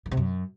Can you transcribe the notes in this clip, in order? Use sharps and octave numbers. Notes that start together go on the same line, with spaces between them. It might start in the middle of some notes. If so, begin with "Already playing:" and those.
D#3
C3
F#2